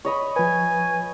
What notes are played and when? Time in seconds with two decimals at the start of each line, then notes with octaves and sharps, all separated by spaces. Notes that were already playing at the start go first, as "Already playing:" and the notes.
0.05 C#5 D#5 B5
0.36 F3 B4 G#5